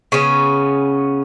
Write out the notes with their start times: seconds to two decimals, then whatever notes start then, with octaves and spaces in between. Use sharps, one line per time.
0.12 C#3 B3 C#4